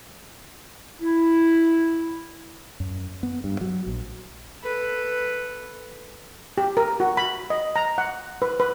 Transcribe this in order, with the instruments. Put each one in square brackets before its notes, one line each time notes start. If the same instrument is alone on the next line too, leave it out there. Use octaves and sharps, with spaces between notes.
[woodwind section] E4
[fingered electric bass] F#2
B3
G2
F#3
A#1
[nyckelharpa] A4 B4
[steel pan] G4
A#4
F#4
B5
D#5
A#5
F#5
B4
B4